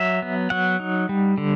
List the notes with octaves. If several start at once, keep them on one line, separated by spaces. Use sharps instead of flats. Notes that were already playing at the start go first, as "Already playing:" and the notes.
Already playing: F#3 E5
B3
F#3 F#5
D#4
G3
D3